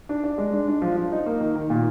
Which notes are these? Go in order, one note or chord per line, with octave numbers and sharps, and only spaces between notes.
D4
D4
G#3
D4
D4
F3
F3
D#4
A#3
D#3
D#3
A#2